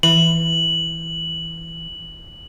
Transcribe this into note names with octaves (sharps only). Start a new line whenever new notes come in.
E3 F#7